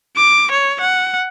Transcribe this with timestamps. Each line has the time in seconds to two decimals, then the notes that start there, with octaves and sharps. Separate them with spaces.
0.16 D6
0.51 C#5
0.81 F#5